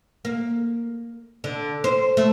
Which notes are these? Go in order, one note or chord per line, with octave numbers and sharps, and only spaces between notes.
A#3
D3
C5
A3